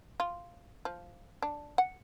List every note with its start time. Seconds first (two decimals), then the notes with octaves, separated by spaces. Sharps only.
0.20 F4
0.85 F3
1.42 D4
1.78 F#5